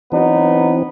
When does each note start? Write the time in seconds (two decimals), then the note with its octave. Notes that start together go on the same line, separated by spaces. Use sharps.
0.12 E3 F#3 B3 C4 D#4